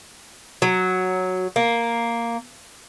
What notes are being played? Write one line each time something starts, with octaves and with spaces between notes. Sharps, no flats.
F#3
A#3